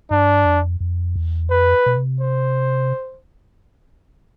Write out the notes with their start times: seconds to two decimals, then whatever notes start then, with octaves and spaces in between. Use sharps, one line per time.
0.11 G2 D4
0.45 F2
0.81 F2
1.16 E2
1.50 F2 B4
1.86 B2
1.96 C3
2.20 C5